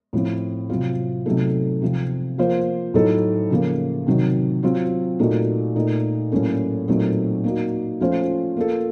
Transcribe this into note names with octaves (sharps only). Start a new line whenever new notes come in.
A2 F3 C4
C3 F#3 C4 F4
C3 F#3 A3 D#4 A4
C3 F3 C4
F3 A#3 F4 C5
A2 F#3 A3 D#4 A4
C#3 F3 A#3
C3 D#3 F#3
F#3 C4 F4
A#2 A3 D#4 F#4
A#2 A3 D#4
A2 F#3 A#3 C#4 A4
A#2 F#3 A3 C4 D#4
A#3 D#4 F#4
F3 A3 C#4 F4 C5
A#3 F4 A4